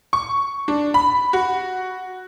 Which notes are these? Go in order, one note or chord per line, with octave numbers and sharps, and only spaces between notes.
C#6
D4
B5
F#4